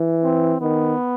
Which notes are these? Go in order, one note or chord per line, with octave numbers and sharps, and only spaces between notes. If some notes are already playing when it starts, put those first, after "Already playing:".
Already playing: E3
C4
D#3 B3